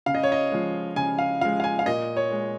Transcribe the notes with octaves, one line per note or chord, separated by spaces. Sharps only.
C#3 F5
D#5
C#5
D#5
F3 G#3
C#3 G#5
F5
F3 G#3 F5
F5
G#5
F5
A#2 D#5
C#5
G#3